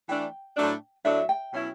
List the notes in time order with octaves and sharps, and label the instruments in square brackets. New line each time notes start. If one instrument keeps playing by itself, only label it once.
[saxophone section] E3 A3 D4 [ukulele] G5
[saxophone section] A2 F#3 A3 D4
[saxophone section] A2 F#3 A3 D4 [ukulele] E5
[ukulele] G5
[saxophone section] B2 F#3 C#4 E4